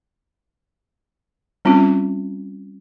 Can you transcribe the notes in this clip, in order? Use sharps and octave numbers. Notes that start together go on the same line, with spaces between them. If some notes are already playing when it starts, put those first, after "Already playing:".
G3 C4 C#4 F4